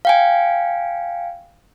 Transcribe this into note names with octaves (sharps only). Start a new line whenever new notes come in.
F5 G5 G#5